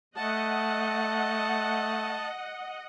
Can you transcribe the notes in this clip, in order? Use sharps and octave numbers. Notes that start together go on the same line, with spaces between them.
A3 D#5 F#5 A5